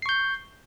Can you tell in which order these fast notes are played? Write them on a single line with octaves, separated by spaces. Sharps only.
C7 C#6 G6